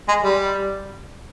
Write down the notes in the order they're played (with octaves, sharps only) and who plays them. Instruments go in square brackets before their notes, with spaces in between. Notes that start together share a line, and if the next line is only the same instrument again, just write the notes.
[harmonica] G#3
G3